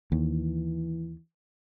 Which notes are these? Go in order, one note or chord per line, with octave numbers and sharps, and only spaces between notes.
D#2 E3